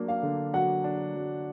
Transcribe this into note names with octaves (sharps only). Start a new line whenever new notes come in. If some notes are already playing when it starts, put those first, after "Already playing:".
Already playing: F#3 A#3 D4
F5
D3
F#3 F#5
D4
F#3